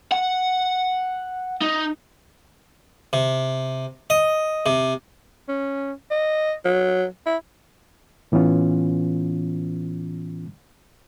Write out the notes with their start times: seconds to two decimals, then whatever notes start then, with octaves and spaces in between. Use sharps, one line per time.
0.12 F#5
1.62 D#4
3.13 C3
4.10 D#5
4.66 C3
5.49 C#4
6.11 D#5
6.65 F#3
7.26 E4
8.32 A2 E3 B3 C#4 F4